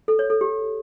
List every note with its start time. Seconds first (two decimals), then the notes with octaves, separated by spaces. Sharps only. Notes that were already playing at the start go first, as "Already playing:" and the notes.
0.08 A4
0.19 C#5
0.30 A4
0.41 G4